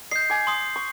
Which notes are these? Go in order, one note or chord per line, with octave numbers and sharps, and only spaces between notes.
D#5 G6 C7
G#5 D6
C6 D#6
C#6